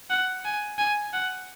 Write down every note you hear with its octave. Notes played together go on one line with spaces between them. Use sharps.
F#5
G#5
G#5
F#5